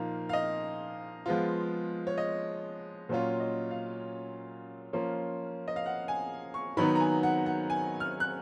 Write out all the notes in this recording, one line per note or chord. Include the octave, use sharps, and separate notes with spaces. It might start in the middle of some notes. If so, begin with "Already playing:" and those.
Already playing: A#2 F3 A#3 D#4 F5
F5
D#5
F3 G#3 B3 F4
C#5
D#5
A#2 F#3 C#4 F4
D#5
F5
F3 A#3 C#4 F4
D#5
F5
F#5
G#5
C#6
D#3 F#3 B3 D#4 B5
A#5
G#5
F#5
F#5
G#5
F6
F#6